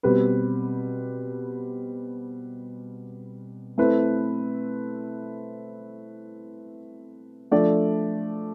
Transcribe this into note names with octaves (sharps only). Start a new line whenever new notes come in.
B2 G3 C4 G4 B4
A3 C4 E4 B4
F3 A3 D4 A4 D5